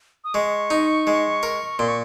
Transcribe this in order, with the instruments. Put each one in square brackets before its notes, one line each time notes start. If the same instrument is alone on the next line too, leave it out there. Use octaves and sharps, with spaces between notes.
[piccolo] D#6
[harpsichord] G#3 [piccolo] C#6
[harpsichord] D#4
G#3
A#4
[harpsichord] A#2 [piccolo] C6
[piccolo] C#6